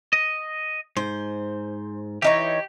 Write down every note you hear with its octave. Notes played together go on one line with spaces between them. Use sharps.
D#5
G#2 C5
E3 D#4 G4 C#5